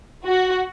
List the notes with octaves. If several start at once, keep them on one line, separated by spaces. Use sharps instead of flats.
F#4